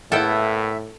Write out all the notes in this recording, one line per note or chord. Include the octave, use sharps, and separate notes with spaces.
A2 A#3 B3 E4 A4 E5 G5